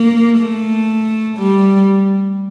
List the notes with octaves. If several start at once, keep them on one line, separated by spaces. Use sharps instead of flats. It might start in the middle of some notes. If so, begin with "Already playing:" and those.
Already playing: A#3
A3
G3